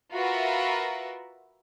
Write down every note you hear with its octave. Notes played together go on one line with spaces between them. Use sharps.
F4 F#4 A#4 B4 E5 F#5